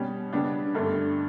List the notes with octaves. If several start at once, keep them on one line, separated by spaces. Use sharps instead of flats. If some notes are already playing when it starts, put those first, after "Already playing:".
Already playing: B2 G3 C#4
C#3 G3 B3 D4
G2 D3 A3 D4